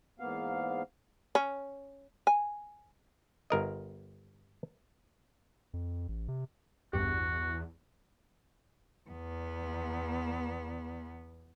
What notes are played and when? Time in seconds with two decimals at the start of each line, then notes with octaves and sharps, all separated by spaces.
0.20 E2 G#2 A#3 B3 F5
1.35 C#4
2.27 G#5
3.50 G1 A#4 D#5
5.73 F2
6.08 A1
6.28 C3
6.93 A1 E2 G2 F#4 G4
9.09 E2 B3